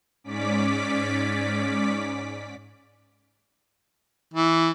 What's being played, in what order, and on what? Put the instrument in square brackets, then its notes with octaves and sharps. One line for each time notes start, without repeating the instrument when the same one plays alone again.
[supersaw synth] G#2 C#4 D5 D6 B6
[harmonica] E3